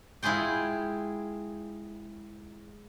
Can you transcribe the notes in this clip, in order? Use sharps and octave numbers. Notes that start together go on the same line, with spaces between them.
G#3 E4 F4 G#4 G5